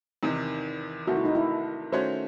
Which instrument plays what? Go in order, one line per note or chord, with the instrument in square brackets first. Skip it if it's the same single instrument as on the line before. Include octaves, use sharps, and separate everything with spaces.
[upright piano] E2 C3 D#3 [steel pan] D#4
[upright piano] C2 C3 D#3 A3 [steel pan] F#4
[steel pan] E4
D#4
E4
[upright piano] D#3 A3 C#4 F#4 C#5 [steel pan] C5